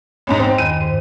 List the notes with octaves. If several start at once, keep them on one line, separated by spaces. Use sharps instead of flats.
A1 E2 G#2
C4 G5
E2 G2 D#3 D#7
G#2 C5